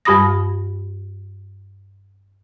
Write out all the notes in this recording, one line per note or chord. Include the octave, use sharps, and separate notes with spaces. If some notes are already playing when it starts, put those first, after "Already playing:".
G2 G3 G4 B5 D#6 A#6